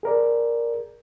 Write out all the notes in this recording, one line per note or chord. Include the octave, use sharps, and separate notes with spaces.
G#4 A#4 D5